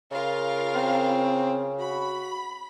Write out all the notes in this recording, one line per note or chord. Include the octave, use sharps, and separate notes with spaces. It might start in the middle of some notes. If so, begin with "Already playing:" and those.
C#3 F4 A#4 F5
C4
F#4 B5